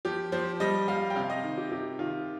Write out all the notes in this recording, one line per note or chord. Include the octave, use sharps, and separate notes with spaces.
F3 G4
F3 C5
G3 D#5
G3 F5
G5
C3 F5
D#5
D#3
G4
C3 G4
D#3 F4